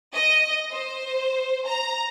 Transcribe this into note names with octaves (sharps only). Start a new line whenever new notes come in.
D#5
C5
A#5